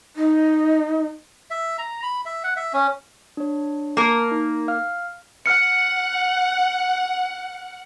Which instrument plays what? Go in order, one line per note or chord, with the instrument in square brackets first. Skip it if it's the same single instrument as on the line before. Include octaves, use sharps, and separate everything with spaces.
[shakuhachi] D#4
[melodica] E5
A#5
B5
E5
F#5
E5
C#4
[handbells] D4 C#5
[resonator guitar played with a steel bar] A#3 A#4 [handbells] A5
[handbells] D#4
F5 F6
[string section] F#5 [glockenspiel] F6 C#7